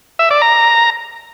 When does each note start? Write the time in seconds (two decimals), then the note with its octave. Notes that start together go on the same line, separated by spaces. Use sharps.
0.19 E5
0.30 D5
0.42 A#5